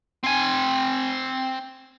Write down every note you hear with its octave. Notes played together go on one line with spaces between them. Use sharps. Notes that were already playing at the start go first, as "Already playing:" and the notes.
C4 G#5